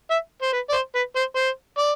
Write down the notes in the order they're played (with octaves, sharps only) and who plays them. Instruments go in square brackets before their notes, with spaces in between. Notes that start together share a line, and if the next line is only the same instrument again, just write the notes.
[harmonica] E5
C5
B4
D5
C5
B4
C5
C5
D5